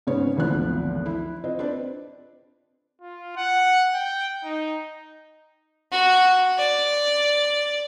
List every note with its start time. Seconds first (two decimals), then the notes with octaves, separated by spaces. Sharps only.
0.07 G#2 C#3 B3 C#4 C5 C#5
0.36 G#1 D2 E3 F3 B3 F#6
1.06 E4
1.44 C4 F4 C5 D#5
1.59 C4 D4 B4 D5
3.01 F4
3.37 F#5
3.94 G5
4.44 D#4
5.91 F#4
6.58 D5